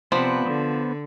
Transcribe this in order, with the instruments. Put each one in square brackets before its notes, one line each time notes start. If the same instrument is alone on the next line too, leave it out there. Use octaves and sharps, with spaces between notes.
[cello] C3 B4 [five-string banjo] F3 [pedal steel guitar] B3 C5 D5
[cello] D3